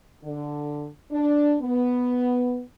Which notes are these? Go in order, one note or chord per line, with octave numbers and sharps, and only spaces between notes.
D3
D4
B3